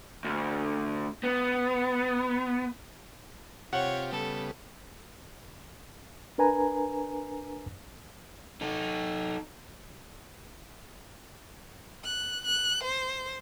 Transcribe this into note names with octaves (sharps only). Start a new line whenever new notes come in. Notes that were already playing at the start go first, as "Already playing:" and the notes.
D2
B3
C3 F4 G4 C#5 F#5
C#3 G3 B3 A4
D4 A#4 B4 G#5 A#5
D#4 A4
F#6
F#6
C5